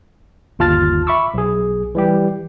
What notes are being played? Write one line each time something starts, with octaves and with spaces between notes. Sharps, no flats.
G1 D#2 F4 A5 F6 A6
E5 B5 C#6 D6 E6
B1 G#4
E3 G3 G4